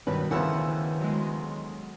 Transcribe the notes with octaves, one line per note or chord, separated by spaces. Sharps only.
G2 B2 D#3 B4
D2 C#3 E3 F3 B3 F#5 E6
F#3 G#3